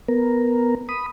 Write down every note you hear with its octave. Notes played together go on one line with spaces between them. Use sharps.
B3 A#4
B5 D#6